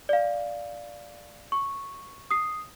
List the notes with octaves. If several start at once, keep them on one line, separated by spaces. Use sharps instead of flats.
D5 F5
C#6
D#6 C7